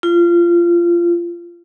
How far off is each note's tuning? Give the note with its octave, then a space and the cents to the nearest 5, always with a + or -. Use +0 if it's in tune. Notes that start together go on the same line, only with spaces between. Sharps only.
F4 -20